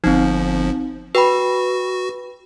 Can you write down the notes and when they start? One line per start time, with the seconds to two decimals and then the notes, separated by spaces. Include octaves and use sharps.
0.04 G1 F3 C4 D#4
1.15 F#4 B4 G5 B5